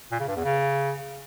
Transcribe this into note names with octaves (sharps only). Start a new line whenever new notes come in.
A#2
C#3
G2
E2
C#3